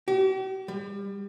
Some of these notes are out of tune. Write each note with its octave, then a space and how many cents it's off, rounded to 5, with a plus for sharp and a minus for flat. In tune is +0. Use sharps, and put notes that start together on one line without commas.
G4 -45
G3 +30